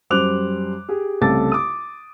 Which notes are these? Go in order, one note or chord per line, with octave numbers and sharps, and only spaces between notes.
F#2 G3 C5 D6 F#6 F7
G4 G#4
C2 C#3 A3 A4 D6 A6
D6 D#6